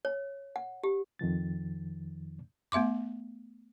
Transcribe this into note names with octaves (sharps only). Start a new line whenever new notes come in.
C#5
F#5
G4
F2 D#3 F3 A6
A3 B3 E5 C6 D6